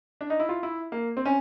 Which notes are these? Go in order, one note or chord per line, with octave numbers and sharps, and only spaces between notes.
D4
D#4
E4
F4
E4
A#3
C4
C#4